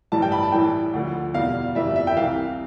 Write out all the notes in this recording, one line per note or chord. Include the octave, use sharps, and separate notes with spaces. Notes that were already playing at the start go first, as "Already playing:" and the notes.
A1 G2 E3 G3 A5
G5
B5
A5
A1 A2 E3 G3 G5
D2 D3 F3
E2 B2 G3 F5
G1 F2 E3 G3 E5
E5
G5
C2 C3 E3 F5